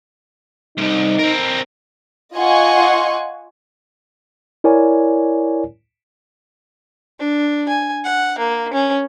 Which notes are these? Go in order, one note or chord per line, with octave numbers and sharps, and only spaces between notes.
C2 G#2 D#4
C4 A#4
F4 D#5 F#5 G#5 C6 C#6
E4 A#4 C#5 D5 G#5
D4
G#5
F#5
A#3
C#4